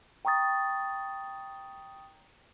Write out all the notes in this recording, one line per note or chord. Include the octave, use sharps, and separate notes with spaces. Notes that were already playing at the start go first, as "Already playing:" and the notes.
G5 A#5 C#6 D#6 A6